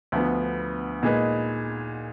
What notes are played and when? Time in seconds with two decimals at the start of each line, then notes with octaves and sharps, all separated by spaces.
0.12 D2 D3 F3 B3
1.03 A#2 G#3 D#4 G#4 B4